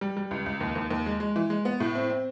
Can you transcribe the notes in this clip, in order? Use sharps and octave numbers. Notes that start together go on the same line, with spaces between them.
G3
G3
C#2
C#2
D#2
D#2
D#2
G#3
G#3
E3
G#3
B3
A2
C4
C4